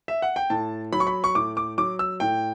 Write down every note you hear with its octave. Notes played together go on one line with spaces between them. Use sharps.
E5
F#5
G5
A2 A5
F#3 B5
C#6
B5
C#6
A2 D6
D6
F#3 D6
E6
A2 G5